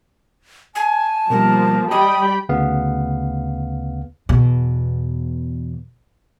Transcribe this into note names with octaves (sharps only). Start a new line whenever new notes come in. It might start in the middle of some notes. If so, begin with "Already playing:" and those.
G#5 A5
B2 F3 G3 A#3 A#4
G3 G4 D#5 G5 G#5 B5 D#6
D2 C#3 B3 F5
E2 B2